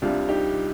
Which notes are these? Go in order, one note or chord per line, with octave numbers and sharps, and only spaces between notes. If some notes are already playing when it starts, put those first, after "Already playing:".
C2 C3 G3 D4 F4
D#4 G4